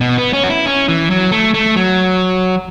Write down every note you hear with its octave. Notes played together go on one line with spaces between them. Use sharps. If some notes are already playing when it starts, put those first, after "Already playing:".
B2
B3
C#4
F#4
E4
C#4
E3
F#3
A3
A3
F#3